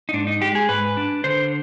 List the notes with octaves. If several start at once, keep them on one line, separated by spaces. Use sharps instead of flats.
D#4
G#2 D4
D#4
G#3 G4
G#4
G#2 B4
D4
D3 C5